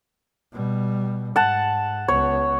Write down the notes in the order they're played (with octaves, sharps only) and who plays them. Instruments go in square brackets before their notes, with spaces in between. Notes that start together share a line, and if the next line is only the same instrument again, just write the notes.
[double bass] B2 G3
[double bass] G#2 [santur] F#5 A5
[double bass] C#2 B3 [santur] C#5